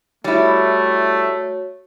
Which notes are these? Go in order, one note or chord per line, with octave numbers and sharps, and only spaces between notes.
G3 A3 E4 F#4 C#5